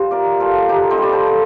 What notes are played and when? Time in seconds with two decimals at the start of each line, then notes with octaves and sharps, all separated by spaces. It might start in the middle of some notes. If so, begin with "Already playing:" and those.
Already playing: F3 G3 C5
0.11 C3 A#4 D5
0.40 C3 F4 A4
0.69 D3 D#4 G4
0.91 C4 D#4
0.98 G3 D5
1.12 A4 C5
1.27 D3